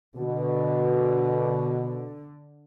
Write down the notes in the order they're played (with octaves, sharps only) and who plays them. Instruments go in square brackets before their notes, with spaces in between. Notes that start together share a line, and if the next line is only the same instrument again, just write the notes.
[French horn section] B2 [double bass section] D3